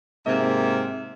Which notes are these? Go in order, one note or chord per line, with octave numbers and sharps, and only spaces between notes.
G#2 C3 A#3 E5